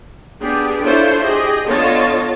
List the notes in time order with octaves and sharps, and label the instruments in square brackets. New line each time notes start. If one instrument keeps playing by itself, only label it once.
[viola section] B3 D4 G4 G#4
D4 E4 F4 A4 C5 C#5
G4 G#4 D#5
D3 B3 F4 C#5 D#5 A5